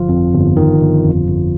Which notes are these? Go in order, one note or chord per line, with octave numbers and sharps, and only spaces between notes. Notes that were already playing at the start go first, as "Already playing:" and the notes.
Already playing: G1 F3 F4
F2
G1
D#3
G1
F2
G1